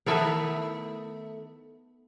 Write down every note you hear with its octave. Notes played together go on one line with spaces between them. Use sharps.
D#3 A3 B3 A4 A#4 E5